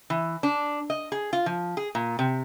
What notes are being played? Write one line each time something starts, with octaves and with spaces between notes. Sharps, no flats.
E3
D4
D#5
G#4
F4
F3
G#4
A#2
C3